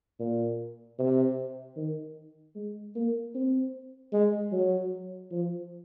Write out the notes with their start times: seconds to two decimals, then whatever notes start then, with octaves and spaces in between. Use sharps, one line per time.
0.20 A#2
0.99 C3
1.77 D#3
2.55 G#3
2.96 A#3
3.35 C4
4.13 G#3
4.52 F#3
5.31 F3